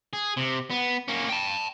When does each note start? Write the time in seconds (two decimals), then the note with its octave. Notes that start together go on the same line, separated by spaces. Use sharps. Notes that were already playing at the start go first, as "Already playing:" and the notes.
0.13 G#4
0.37 C3
0.70 B3
1.08 A#3 C#4
1.29 G5 A5